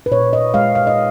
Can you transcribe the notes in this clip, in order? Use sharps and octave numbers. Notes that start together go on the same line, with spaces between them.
B4
A#2 C#5
D#5
G#3 F5
F5
D#5